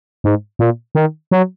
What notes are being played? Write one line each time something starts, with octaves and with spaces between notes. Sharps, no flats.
G#2
A#2
D#3
F#3